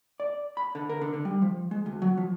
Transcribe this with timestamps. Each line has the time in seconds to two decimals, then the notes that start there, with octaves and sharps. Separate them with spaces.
0.20 D5
0.57 B5
0.75 D3
0.89 A#4
1.01 D3
1.14 D3
1.25 G3
1.42 F3
1.71 G#3
1.86 D2
2.02 F#3
2.17 F3